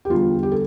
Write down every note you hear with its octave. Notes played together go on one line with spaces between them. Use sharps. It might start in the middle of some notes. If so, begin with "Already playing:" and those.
G4
E2 D3 G3 F4
G4
A4